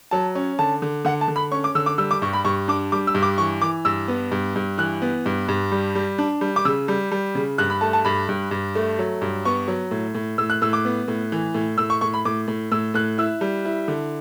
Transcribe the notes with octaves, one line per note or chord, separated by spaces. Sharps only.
F#3 A5
C#4
D3 A5
D3
D3 F#5
A5
D3
B5
C#4 C#6
D6
D3 E6
D6
G3 E6
D6
G2 C#6
B5
G2 C#6
D4 D6
G3 D6
E6
G2
D6
E3 C#6
E3 D6
G2 E6
B3
G2
G2
E3 F#6
B3
G2
G2
G3
G3
D4
G3
D6
C#3 E6
G3
G3
C#3
G2 F#6
B5
A3 A5
A5
G2 B5
G2
G2
A3
F#3
G2
B3 C#6
F#3
A2
A2
A2 E6
F#6
A2 E6
D6
B3
A2
E3
A2
A2 E6
C#6
A2 C#6
B5
A2 D6
A2
A2 E6
A2 F#6
E4 E6
G3
E4
D3